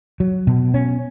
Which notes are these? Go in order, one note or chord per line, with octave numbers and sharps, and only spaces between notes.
F#3
B2
C#4